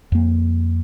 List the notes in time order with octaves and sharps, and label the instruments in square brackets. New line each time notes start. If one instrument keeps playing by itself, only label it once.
[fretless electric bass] F2 A#3